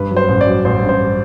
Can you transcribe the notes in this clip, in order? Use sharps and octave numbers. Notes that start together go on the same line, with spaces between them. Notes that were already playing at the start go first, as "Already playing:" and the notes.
Already playing: G2 B4
F#3
C5
A1
D5
F#3
A1 C5
G2
C5